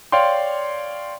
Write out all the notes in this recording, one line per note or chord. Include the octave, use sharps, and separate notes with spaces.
C#5 D5 F5 G5 C6